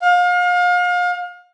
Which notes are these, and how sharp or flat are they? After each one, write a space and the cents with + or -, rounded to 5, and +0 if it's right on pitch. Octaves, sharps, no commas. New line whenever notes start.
F5 +35